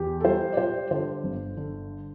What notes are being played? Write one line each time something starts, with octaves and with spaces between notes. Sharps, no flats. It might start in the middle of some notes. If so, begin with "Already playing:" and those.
Already playing: E2 G4
A4
G3 C5
D5
G3 C5
D3 C5
G1
D3